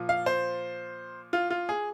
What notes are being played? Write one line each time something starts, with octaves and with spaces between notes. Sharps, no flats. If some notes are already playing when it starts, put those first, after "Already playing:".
Already playing: A#2 F3
F5
C5
F4
F4
G#4